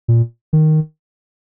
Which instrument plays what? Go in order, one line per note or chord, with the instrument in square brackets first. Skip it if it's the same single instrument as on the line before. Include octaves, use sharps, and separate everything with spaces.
[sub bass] A#2
D#3